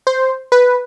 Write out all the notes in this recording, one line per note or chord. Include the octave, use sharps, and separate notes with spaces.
C5
B4